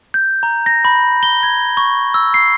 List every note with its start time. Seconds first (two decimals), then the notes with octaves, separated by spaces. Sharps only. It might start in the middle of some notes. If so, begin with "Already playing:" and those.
0.14 G6
0.43 A#5
0.66 A#6
0.85 B5
1.23 G7
1.43 G#6
1.77 C#6
2.14 E6
2.34 C7